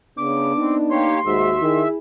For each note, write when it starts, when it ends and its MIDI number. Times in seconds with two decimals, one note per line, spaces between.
0.17 0.52 49
0.17 1.13 59
0.17 1.13 62
0.17 0.75 86
0.58 0.77 60
0.58 1.18 63
0.90 1.20 58
0.90 1.20 67
0.90 1.20 73
0.90 1.83 84
1.26 1.60 39
1.26 1.51 44
1.26 1.60 66
1.26 1.88 76
1.62 1.85 51
1.62 1.97 64
1.62 1.97 68